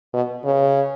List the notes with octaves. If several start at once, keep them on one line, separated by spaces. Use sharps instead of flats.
B2
C#3